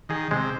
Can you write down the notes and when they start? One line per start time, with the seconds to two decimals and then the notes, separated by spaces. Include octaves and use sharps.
0.09 D#3 G#4
0.31 C3 G#3